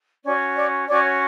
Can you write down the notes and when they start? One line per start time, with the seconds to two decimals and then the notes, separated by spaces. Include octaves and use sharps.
0.23 C#4 F#4 C#5 D5
0.56 D5
0.87 C#4 F#4 C#5 D5